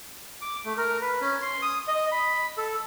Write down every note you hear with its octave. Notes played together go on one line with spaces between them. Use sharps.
D6
A3
A#4
B4
C#4
C6
D#6
D#5
B5
A4